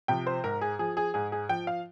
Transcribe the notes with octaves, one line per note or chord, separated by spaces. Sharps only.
C3 F3 G5
C5
G#2 A#4
G#4
F3 G#4
G#4
G#2 G#4
G#4
F3 G5
F5